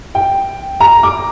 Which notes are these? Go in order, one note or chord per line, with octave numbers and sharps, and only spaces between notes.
G5
A#5
D6